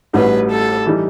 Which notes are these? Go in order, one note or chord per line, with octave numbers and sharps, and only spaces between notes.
A1 A2 G3 D#4 F#4 B4
A4
E3 G3 D#4